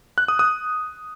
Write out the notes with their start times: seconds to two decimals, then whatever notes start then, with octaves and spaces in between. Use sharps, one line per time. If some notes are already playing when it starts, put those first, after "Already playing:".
0.18 F#6
0.28 D#6
0.39 D#6